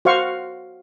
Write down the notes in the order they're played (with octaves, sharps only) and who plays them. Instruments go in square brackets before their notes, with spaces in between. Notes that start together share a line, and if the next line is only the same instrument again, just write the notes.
[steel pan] F#4 C5 F5 C#6